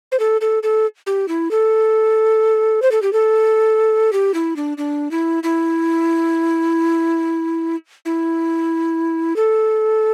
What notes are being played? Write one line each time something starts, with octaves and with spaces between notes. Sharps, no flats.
C5
A4
A4
A4
G4
E4
A4
C5
A4
G4
A4
G4
E4
D4
D4
E4
E4
E4
A4